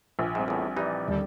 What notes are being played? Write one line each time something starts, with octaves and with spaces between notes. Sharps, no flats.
A#1
G#2 G3 C4
E2 A2
E3 D#4 G4 D5
D#2 D3 G3 A4